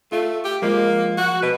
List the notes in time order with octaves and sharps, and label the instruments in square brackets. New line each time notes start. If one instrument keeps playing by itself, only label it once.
[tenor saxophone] A3 [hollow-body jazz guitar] F4
[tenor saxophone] G4
[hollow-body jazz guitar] F3 G#3 [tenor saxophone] A#3
[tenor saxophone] F#4
[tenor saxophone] B2 [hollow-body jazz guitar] B4